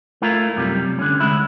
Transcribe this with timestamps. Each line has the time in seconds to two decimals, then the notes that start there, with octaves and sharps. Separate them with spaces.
0.22 A3 E4 F4 A#4
0.57 F#2 C3 G3
0.99 D3 C#4
1.20 D2 G#3 E4